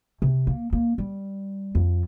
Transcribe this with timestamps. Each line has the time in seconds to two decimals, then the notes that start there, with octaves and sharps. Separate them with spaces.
0.22 C3
0.47 A#3
0.73 A#3
0.98 G3
1.75 F2